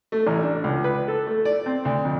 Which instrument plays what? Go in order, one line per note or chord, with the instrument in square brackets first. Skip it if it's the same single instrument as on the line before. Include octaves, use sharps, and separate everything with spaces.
[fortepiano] A3
A1
D4
C#2
B4
A4
A3
D5
C4
D2
F2